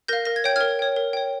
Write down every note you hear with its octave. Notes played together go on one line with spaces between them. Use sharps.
A#4 F5 G6 A#6
A#4 A#6
G#6
C#5 G5 G6
A#4 F6 G#6
C#5 G5
A#4
C#5 G5